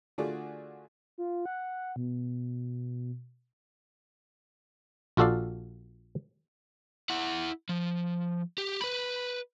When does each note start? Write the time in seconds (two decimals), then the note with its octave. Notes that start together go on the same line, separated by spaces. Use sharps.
0.18 D3 A3 F4 F#4 G#4 D5
1.18 F4
1.46 F#5
1.96 B2
5.17 A#1 F4 F#4 A4 D5 F5
7.10 E4 F#5
7.69 F3
8.58 G4
8.81 B4 B5